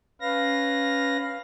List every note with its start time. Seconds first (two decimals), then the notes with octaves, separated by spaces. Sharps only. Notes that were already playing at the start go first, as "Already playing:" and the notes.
0.21 C#4 B4 F5 A#6